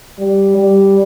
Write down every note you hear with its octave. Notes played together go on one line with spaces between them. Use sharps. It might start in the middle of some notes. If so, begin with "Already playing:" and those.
G3
G3